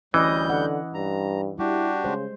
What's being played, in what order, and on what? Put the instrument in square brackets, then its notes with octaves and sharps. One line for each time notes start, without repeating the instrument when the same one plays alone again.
[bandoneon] D2 G3 G6 [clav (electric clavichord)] E3 [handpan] C#4 D#5
[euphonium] D3 [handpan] F#5
[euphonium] G2 [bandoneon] A#5
[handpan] G3 [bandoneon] D4 F#4 G4 [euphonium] E4
[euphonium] C#3 [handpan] G#3 C5